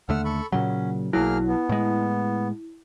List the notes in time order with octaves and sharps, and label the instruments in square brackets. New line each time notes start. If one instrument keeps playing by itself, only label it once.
[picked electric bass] D#2 D3 A3 [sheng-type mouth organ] F#5 E6 F6
[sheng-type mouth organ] A4 B5 C#6
[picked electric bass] A#2 C#3 F#3 [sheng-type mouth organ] C#4 [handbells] F#5
[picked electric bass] B1 F#3 [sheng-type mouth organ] A#3 G#4 F6 [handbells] E4
[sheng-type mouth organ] B3
[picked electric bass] A2 G#3